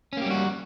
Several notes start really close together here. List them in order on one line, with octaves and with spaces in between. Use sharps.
C#4 A#3 G4 G3 F#4